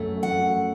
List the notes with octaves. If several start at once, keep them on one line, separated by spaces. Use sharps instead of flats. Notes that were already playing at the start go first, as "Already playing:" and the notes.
Already playing: F#2 F#3 A3
F#5